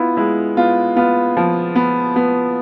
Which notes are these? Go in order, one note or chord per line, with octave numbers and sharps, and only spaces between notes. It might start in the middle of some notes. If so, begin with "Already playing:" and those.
Already playing: B3 E4 F4
G#3 E4
B3 F4
B3 F4
F3
B3
B3